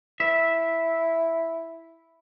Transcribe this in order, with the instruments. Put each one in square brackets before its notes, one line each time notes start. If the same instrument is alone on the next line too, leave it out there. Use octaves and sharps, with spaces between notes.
[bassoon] E4 [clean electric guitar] E5